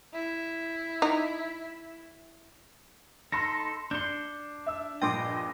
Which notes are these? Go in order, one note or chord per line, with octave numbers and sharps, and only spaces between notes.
E4
D#4
D#4 A4 B5 C6 A#6
D4 C6 G6 C#7
E5 E6
A#1 G2 A#2 D#5 G5 C6 D6